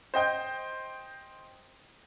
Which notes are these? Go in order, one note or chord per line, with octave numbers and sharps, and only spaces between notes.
C5 D#5 G5 G6